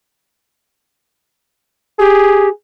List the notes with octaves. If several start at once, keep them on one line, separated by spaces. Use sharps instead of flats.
G4 G#4